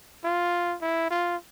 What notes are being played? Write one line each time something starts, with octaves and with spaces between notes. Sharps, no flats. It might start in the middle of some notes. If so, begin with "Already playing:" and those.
F4
E4
F4